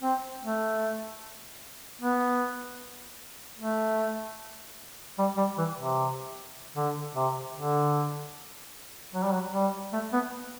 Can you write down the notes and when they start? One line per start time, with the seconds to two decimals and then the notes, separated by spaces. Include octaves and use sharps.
0.02 C4
0.42 A3
2.01 B3
3.59 A3
5.18 G3
5.37 G3
5.58 E3
5.77 C3
6.76 D3
7.15 C3
7.55 D3
9.14 F#3
9.23 G3
9.32 F#3
9.54 G3
9.93 A3
10.12 B3